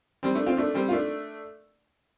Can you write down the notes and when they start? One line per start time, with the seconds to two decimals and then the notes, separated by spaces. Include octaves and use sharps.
0.23 G3 C4
0.35 A3 D4
0.46 C4 F4
0.57 A3 D4
0.74 G3 C4
0.89 F4
0.92 A3 D4